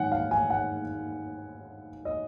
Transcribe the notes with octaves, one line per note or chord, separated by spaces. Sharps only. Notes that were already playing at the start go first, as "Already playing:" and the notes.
Already playing: G#2 D#3 F#5 G#5
F5
G#5
F#5
D#5